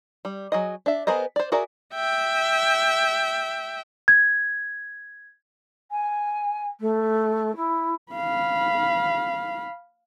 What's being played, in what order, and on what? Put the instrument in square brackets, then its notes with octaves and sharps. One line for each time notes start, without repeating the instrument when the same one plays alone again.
[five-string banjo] G3
F#3 G#4 D#5
D4 E5
B3 G#4 A#4 C5 D#5
C5 D5
F#4 G#4 A#4 D5 E5
[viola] E5 G5
[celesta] G#6
[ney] G#5
A3
E4
[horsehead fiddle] F5 B5